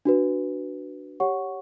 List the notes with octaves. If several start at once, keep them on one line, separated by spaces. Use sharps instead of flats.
D4 F#4 B4
G4 C#5 F#5 C#6